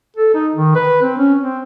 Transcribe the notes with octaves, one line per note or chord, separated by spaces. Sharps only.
A4
D#4
D#3
B4
C4
C#4
C4